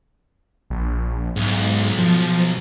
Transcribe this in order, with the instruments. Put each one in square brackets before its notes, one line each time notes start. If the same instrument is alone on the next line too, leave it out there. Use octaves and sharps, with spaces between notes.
[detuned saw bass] A#1
[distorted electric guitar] B1 [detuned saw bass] G#2
[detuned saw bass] F3